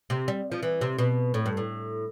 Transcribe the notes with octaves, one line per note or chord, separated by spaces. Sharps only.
C3
G3
F3
E3
C3
B2
A2
G2
A2